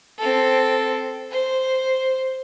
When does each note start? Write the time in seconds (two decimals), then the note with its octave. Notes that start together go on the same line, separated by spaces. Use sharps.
0.19 C4 A4
1.32 C5